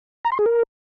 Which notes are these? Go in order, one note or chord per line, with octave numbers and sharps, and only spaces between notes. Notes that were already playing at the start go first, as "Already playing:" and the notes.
A#5
C6
G#4
A#4